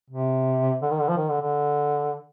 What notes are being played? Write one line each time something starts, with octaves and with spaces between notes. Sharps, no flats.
C3
D3
D#3
D3
F3
D#3
D3
D3